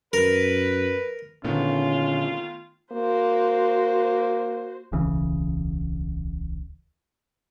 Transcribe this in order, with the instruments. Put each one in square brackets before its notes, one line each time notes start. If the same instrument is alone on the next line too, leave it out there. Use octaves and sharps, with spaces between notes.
[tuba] F#2 [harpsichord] A#4 [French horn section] B4
[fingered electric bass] A#2 D3 [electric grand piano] D#3 A3 B3 [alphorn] C#4 [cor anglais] F4
[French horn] A#3 [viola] F#4 C5
[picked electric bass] D1 B1 C#3 E3